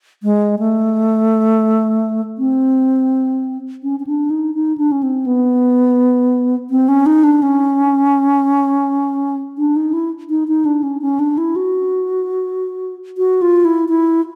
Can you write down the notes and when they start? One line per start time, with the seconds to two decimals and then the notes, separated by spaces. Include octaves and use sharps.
0.23 G#3
0.59 A3
2.38 C4
3.83 C#4
4.00 C#4
4.07 D4
4.30 D#4
4.54 D#4
4.78 D4
4.92 C#4
5.03 C4
5.26 B3
6.70 C4
6.88 C#4
7.06 D#4
7.24 D4
7.42 C#4
9.58 D4
9.76 D#4
9.93 E4
10.30 D#4
10.48 D#4
10.65 D4
10.83 C#4
11.02 C#4
11.19 D4
11.38 E4
11.56 F#4
13.18 F#4
13.42 F4
13.65 E4
13.89 E4